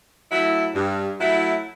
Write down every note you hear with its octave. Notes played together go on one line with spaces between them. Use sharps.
F#3 A3 E4
G2
F#3 A3 E4